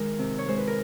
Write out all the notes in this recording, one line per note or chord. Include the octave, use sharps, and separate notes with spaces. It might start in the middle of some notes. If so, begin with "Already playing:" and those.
Already playing: D#3 G#3 A#4
C3
C#5
G#3 C5
B4
A#4